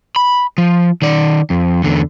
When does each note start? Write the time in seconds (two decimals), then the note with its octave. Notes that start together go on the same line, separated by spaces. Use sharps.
0.16 B5
0.58 F3
1.02 D#3 D5
1.50 F2
1.84 E2 D3